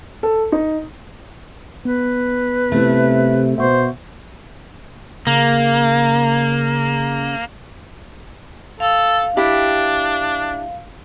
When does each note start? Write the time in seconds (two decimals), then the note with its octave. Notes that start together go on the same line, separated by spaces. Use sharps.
0.23 A4
0.52 D#4
1.85 B3 B4
2.72 C3 A3 E4
3.58 B2 C5 E5 F#5 C#6
5.27 C#3 A#3
8.80 A4 F5
9.37 D4 E4 G4